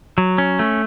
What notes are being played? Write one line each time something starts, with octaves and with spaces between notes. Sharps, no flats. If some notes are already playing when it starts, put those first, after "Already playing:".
F#3
C#4
A3